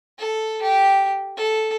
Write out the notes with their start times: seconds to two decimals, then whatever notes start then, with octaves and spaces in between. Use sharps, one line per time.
0.19 A4
0.62 G4
1.37 A4